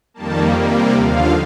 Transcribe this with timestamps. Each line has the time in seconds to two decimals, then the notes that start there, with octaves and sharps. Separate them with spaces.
0.14 F2 D#3 G3 A#3 A5
0.54 C3 G3 A#3
0.93 D#2 D3 F3 F5